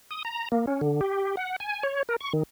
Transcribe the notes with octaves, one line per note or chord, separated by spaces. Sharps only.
D#6
A#5
A#3
C#4
D3
G4
F#5
G#5
C#5
A#4
C#6
D#3